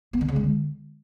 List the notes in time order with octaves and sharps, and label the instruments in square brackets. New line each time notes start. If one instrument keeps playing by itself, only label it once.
[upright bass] B3
D3
C#3
G#3
D3